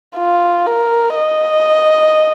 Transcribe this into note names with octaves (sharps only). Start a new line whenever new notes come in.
F4
A#4
D#5